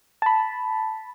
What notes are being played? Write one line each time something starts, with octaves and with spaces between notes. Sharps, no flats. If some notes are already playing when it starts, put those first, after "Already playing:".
A5 B5